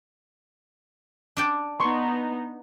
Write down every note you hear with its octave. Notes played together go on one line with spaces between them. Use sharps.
D4 D5 G5
B3 D#4 C6 C#6